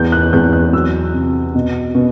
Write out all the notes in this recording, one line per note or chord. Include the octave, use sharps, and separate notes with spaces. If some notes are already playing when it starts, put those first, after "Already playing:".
Already playing: E2 G6
F#6
E2 G6
F#6
F#3 E6
C3
B2
B2